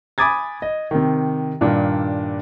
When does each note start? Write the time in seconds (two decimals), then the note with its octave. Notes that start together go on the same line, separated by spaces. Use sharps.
0.18 G#5 B5 D6 D#6 G#6 A6
0.62 D#5
0.91 C3 D#3
1.61 G2 A#2 D#3 A#3 D4